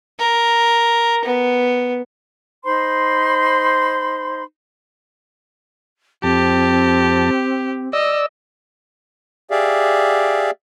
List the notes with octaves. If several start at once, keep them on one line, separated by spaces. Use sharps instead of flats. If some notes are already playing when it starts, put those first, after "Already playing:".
A#4
B3
D#4 C5 B5 C6
F2 C4 G4 A5
D5 D#5 E6
G4 G#4 D5 E5 F5